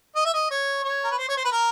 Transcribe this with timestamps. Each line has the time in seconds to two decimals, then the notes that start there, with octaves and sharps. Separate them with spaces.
0.15 D#5
0.25 E5
0.34 D#5
0.50 C#5
0.84 C#5
1.04 A#4
1.11 B4
1.19 C5
1.29 C#5
1.37 C5
1.45 B4
1.52 A#4